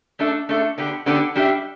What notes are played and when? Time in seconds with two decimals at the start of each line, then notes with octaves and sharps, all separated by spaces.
0.19 A3 D4 A4 E5
0.49 A3 D4 A4 E5
0.78 D3 B3 D4 G4
1.06 D3 B3 D4 G4
1.36 G3 D4 G4 E5